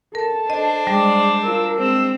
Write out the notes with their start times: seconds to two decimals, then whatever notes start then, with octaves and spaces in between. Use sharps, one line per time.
0.15 A4 A#4 A5
0.50 D4 C5 D#5
0.87 G3 G#3 D5
1.43 F4 A#4 E6
1.78 G#3 C4 E6